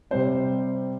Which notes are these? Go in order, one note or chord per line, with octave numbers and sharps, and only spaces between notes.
C3 G3 C4 C5